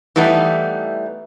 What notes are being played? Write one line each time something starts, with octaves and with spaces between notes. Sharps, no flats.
E3 G3 A3 B3 D#4